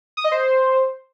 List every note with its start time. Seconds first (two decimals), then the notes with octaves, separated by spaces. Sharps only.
0.17 D#6
0.24 D#5
0.32 C5